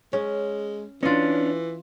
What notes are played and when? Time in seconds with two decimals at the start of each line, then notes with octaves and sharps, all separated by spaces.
0.13 G#3 C#4
1.03 E3 C#4 D4 F4 D#5